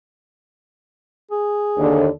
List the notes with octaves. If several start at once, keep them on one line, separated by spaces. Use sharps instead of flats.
G#4
D#2 D3